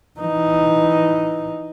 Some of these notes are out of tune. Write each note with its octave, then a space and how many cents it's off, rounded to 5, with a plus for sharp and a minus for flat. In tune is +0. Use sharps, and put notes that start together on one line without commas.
E3 +0 D#4 +0